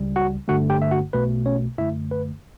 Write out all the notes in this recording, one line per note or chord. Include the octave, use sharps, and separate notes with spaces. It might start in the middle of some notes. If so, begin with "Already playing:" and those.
Already playing: C#2 C#3 G3
F#4 F#5
G1 G2 D3 A3 F#4 F#5
G4 G5
E5
F#4 F#5
B1 B2 A3 B4
C#4 C#5
F#2 D3 A3 E4 E5
B4